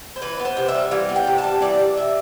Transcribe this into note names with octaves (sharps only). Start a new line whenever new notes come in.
C5
E3 B4
B3
C5
C3
E5
G3
E3 F5
B3
G5
C3
A5
G3
E3 D5
C3
C3 E5